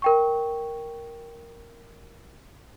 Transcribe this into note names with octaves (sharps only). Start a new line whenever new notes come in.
A#4 G5 C#6